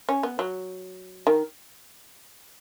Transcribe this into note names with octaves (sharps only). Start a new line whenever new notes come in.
C#4
B3
F#3
D#3